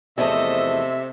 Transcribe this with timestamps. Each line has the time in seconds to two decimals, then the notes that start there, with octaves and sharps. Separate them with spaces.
0.18 E2 C3 F3 A3 A4 D#5 E5